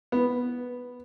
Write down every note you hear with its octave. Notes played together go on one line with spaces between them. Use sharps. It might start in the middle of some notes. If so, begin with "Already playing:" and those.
B3